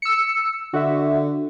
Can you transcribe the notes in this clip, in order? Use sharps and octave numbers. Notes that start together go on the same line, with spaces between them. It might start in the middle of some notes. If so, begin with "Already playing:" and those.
E6 C#7
D3 F#4 E5